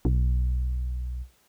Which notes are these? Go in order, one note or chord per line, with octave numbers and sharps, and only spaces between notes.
B1